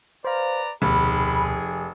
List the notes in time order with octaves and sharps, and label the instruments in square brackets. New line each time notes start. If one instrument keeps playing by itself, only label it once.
[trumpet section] B4 D5 A#5 [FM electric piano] C5 F5
[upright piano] F1 [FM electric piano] D2 B2 [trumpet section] G#4 [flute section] B5